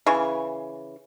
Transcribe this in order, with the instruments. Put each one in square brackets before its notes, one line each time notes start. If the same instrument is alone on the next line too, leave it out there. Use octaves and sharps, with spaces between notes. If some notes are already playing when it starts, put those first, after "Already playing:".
[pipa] C#3 E3 C#6